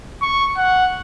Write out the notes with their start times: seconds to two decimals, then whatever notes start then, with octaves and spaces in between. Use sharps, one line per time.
0.22 C#6
0.57 F#5